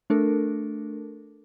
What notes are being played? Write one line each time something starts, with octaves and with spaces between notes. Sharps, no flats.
A3 D4 A4 A#4